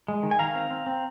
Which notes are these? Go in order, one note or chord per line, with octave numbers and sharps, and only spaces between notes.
G#3
D#3
G#5
D#3 F5 A#5
C4
C4
C4